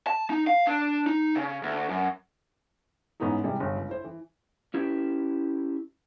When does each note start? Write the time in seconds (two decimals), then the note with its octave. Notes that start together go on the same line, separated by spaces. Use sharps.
0.07 A5
0.30 D#4
0.47 F5
0.67 D4
1.07 D#4
1.36 C#3
1.63 D2
1.89 F#2
3.20 G#2 E3 B3 C#4 D#4 E4
3.44 C3 E3 G3 G#3
3.60 G1
3.75 C#2
3.89 E4 C5
4.04 E3
4.74 C#4 E4 G4 B4